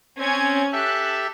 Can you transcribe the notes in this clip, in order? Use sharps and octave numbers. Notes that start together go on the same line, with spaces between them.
C4 C#4 G#6
G4 A4 E5 A5 F#6